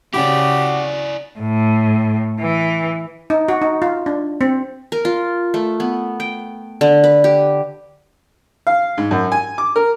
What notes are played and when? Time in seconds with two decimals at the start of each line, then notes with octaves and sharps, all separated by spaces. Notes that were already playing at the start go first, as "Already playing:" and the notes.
0.14 C#3 E4 F#4 G4 D5
1.40 A2
2.40 E3
3.30 D#4
3.48 F#4
3.62 D#4
3.82 F4
4.06 D4
4.41 C4
4.92 A#4
5.05 F4
5.54 A3
5.80 B3
6.20 G5
6.81 D3
7.04 B4
7.24 G4
8.67 F5
8.98 G#2
9.11 F#2
9.32 G#5
9.58 D6
9.76 A#4